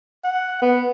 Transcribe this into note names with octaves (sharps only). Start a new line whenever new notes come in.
F#5
B3